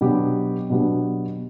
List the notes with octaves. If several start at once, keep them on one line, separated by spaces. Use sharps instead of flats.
B2 F#3 B3 D4 G4
B2 F#3 B3 D4 G4